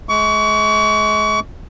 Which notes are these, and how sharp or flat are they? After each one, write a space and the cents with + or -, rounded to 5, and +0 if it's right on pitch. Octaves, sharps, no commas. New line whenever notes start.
G#3 +40 C#6 +35